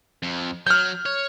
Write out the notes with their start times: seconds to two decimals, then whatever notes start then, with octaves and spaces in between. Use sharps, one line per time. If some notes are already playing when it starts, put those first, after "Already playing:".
0.23 F2
0.67 F#3 F6 G6
1.06 C#5